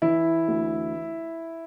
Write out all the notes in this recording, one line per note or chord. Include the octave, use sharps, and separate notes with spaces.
E3 E4
D2